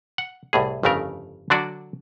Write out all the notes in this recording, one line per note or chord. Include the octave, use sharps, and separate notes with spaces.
F#5
C2 A2 G#4
G1 F2 C#3 A3 A#4
D3 F#3 D4 F#4 D5